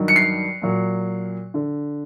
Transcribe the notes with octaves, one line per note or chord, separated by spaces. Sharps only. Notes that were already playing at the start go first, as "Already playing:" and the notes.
Already playing: G2 D#3 F#3
C#7
C7
A#2 F#3
D3